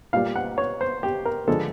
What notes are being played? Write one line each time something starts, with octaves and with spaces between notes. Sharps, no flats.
A#2 G3 F5
F#5
C#5
C5
G4
A#4
D3 F3 G#3 A4